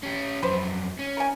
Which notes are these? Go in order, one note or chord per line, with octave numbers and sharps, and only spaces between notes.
C#4 G4
F2 F#3 B4 C5
C#4
A#4 G#5